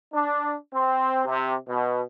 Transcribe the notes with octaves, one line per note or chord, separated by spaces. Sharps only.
D4
C4
C3
B2